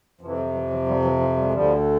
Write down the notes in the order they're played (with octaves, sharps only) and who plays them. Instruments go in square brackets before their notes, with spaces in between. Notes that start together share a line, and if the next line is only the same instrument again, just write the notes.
[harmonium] F2 C3 E3 F3
E3 F#3
E3 F#3
E3 F#3
F3 G3
E3 F#3
F3
G3
G#3
D2 D3 F3 G3